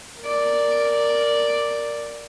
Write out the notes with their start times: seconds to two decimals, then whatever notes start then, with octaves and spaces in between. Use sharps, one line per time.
0.22 A#4 D5